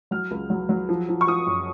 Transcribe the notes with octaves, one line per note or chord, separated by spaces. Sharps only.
F#3 F6
C#2
F#3
F#3
F3
F3
C#6
F3 D#6
F#2